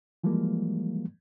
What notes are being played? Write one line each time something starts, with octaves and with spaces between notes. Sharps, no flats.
E3 F3 G3 G#3 A#3